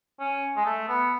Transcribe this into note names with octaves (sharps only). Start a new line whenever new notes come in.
C#4
G#3
A3
B3